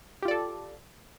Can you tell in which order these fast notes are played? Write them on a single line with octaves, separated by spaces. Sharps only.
G4 F4 D5 A4